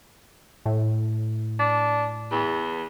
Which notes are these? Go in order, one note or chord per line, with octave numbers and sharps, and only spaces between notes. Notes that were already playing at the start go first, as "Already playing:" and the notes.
A2
D4
E2